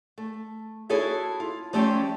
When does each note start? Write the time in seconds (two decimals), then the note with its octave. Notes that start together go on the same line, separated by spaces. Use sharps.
0.18 A3
0.89 E4 F#4 G#4 A4 C#5 E5
1.40 F4
1.73 F3 G3 A3 C4 C#4 G4